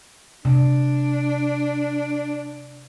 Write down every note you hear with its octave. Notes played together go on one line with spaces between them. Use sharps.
C3 D4